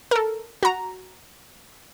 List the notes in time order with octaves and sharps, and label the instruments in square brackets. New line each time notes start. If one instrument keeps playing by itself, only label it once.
[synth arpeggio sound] A4 A#4
F#4 A#5